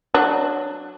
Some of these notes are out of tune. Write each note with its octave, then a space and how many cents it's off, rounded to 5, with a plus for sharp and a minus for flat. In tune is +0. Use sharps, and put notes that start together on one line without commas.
F#3 +0 D4 +15